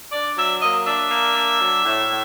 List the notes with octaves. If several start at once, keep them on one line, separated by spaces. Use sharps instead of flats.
D4 D5
F#3 E5
A#3 D#5
D4 E5
A#3
D4
F#3
A2
A2